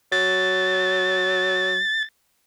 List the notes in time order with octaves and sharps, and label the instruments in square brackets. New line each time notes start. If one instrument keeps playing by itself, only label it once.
[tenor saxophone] F#3 [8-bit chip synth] A6